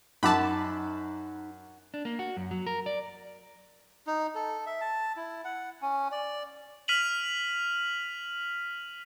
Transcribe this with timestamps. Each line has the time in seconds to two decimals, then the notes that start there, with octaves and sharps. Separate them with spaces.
0.23 F#2 D#4 F#5 A5 B5 D6
1.94 D4
2.05 A#3
2.19 F#4
2.37 F#2
2.51 F#3
2.66 A#4
2.86 D5
4.07 D#4
4.35 A4
4.66 E5
4.81 A5
5.17 E4
5.44 F#5
5.82 C#4
6.12 D5
6.88 F6 B6 D#7 F7 F#7